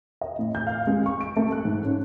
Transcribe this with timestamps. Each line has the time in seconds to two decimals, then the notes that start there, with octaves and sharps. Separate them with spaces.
0.21 D#5
0.39 A2
0.55 G6
0.67 F5
0.87 G#3
1.06 C#6
1.21 D7
1.36 A3
1.52 F#6
1.65 G#2
1.84 C#4